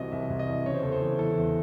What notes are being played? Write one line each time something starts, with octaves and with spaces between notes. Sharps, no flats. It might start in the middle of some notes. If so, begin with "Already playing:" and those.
Already playing: C2 C3 E3 F#4 D#5
C2 E5
C2
D#5
E3
C#3 C#5
C5
E2 A4
C5
E3
E3 A4
E2